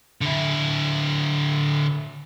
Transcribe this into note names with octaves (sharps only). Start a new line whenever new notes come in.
D3 E4